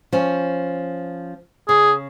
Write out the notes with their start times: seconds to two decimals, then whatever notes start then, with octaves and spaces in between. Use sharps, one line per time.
0.12 F3 C#4
1.69 C#3 G#4